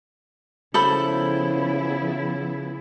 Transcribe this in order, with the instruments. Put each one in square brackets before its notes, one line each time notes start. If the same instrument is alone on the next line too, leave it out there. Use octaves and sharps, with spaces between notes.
[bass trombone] C#3 [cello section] F3 B3 E4 [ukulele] A4 C5 B5